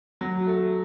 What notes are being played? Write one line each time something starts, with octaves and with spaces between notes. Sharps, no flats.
F#3 F#4
A3